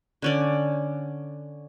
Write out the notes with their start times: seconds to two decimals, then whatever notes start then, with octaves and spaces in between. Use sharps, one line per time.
0.22 D3 C#4 D5